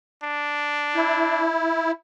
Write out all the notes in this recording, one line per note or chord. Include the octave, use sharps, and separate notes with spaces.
D4
E4